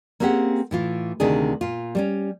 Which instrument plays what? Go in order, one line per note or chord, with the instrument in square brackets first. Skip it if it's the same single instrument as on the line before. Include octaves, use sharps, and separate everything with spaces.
[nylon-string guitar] A#3 C4 C#4 G4 G#4 F#5
A2 E3 F4
D2 C3 D#3 G#3 D4 G#4
A#2 F4
G3 C4 C#4